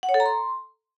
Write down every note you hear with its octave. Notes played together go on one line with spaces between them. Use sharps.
F#5
C#5
A4
A#5
C6